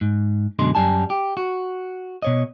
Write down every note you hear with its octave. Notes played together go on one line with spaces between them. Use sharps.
G#2
F#2 B2 D3 G#3 C6
F#2 G3 G#5 A5
G4
F#4
B2 C#5 D#5